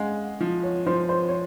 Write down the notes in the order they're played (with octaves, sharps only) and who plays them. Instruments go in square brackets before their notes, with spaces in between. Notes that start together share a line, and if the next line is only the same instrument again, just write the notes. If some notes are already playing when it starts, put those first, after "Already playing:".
Already playing: [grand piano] G#3 C#4 [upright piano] F5 F#5
[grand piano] F3
[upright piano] C#5
[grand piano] F3 [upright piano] C5
[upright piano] C5
C#5